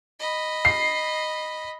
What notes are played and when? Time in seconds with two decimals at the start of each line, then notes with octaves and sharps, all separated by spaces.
0.19 D#5 B5
0.65 C7